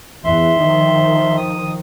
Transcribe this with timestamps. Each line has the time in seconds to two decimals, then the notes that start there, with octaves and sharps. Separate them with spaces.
0.24 E2 E5 C6
0.58 D#3 F3
1.37 D#6